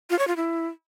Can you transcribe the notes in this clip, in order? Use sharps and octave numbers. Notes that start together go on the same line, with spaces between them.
F4
C#5
F4
E4